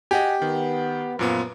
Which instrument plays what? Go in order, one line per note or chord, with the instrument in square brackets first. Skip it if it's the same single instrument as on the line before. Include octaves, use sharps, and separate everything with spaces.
[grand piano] G4 [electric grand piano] D#5 F#5 G#5
[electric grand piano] D#3 [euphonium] B3
[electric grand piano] F#2 A#2 B3 [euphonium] F3